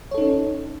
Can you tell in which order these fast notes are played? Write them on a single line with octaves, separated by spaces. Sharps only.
C#5 A4 D#4 C#4